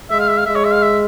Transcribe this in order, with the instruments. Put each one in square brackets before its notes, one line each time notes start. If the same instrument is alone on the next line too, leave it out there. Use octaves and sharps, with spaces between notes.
[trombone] G#3 [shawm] E5
[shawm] F5
E5
F5
[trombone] G#3 [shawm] E5
[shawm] C#5
E5
F5
E5